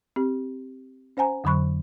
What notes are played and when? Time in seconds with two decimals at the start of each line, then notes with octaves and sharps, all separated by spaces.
0.16 C4 G4
1.17 C#4 C5 F#5 G#5 A#5
1.44 F2 D3 F#3 B5 C#6 F#6